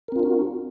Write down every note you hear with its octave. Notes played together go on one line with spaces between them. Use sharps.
C4 D4 F4 F#4 A#4